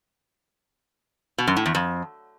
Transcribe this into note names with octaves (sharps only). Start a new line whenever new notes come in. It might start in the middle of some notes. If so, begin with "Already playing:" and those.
B2
F#2
A2
E2
F2